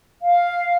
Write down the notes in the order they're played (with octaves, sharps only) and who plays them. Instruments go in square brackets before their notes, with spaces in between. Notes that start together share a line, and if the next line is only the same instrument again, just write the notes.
[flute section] F5